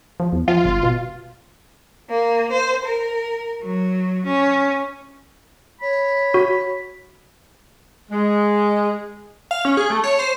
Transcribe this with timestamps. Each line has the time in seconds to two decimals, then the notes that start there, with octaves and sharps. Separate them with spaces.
0.20 F3
0.33 E2
0.48 F3 F4
0.65 G1
0.83 B2
2.09 A#3
2.51 C5
2.85 A#4
3.62 F#3
4.26 C#4
5.81 C#5 B5
6.34 F#4
8.10 G#3
9.51 F5
9.65 C#4
9.77 G#4
9.90 A3
10.04 C#5
10.19 C5